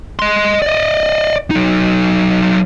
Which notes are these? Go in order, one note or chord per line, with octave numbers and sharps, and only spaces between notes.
D#5 C6
D5 D#5
F#3 D#4